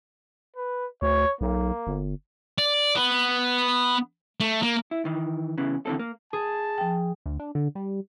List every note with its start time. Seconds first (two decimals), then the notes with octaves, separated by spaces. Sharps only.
0.56 B4
1.02 D2 C#5
1.41 B1 A#3
1.87 G1
2.58 D5
2.96 B3
4.40 A3
4.63 A#3
4.91 E4
5.05 D#3 E3
5.58 C#3 E3 B3
5.86 D3 E3 C4 A4
5.99 A#3
6.33 G#4 A5
6.78 F3 G5
7.26 D2
7.39 D4
7.55 D3
7.75 G3